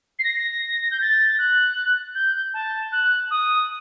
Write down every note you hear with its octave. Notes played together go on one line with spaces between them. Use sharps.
C7
A#6
A#6
G6
A6
F#6
G6
A5
F#6
D#6